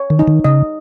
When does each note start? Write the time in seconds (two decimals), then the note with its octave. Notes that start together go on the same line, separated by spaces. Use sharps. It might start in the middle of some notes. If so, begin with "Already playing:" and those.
Already playing: C#5
0.10 D#3
0.19 D#4
0.28 D#3
0.44 C#3 D#5